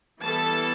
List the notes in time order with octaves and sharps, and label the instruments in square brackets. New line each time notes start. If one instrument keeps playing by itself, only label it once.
[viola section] E3 G3 B3 A4 A5